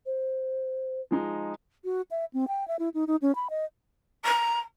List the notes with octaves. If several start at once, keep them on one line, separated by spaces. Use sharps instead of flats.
C5
F3 G#3 D#4
F#4
E5
C4
G5
E5
E4
D#4
D#4
C#4
B5
D#5
A#5